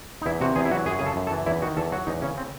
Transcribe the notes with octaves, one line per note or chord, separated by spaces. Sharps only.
D#4
E2 E4
C3 F#4
E2 G#4
E4
F#3 F#4
F#2 G#4
C#3 G#4
A4
F#2
A4
E3
E2 E4
D#3 F#4
E2 A4
F#3 F#4
E2 D#4
C#3 C#4
C4